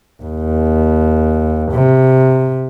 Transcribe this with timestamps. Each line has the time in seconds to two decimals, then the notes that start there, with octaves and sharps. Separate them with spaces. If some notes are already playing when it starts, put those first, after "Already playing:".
0.22 D#2
1.71 C3